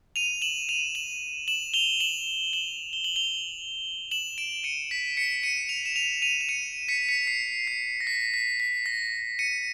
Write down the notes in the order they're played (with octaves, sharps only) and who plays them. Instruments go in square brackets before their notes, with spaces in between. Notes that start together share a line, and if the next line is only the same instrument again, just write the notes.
[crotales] D#7 F7
E7 F#7
D#7 F7
E7 F#7
E7 F#7
F7 G7
E7 F#7
E7 F#7
G7
F#7
F7 G7
E7 F#7
D7 E7
C#7 D#7
B6
B6 C#7
C#7 D#7
D#7 F7
E7
D#7 F7
D#7 F7
E7
C#7 D#7
B6 C#7
B6 C#7
C7
C7
A#6
B6
B6
B6
A#6
C#7 D#7